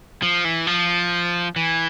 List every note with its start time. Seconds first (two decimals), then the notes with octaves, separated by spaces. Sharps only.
0.22 F3
0.45 E3
0.67 F3
1.56 E3